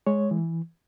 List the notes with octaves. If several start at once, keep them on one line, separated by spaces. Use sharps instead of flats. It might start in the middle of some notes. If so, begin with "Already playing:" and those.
G#3 C#5
E3